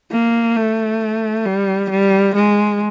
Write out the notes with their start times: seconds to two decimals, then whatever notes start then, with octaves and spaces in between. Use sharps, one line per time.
0.12 A#3
0.56 A3
1.45 G3
1.90 G3
2.35 G#3